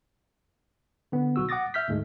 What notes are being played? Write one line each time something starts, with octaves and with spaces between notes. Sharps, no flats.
D3 B3
B1 F#4 E6
F#5 D6 D#6 A6 A#6
E5 F6 G6 B6
D2 G#2 G#3 A3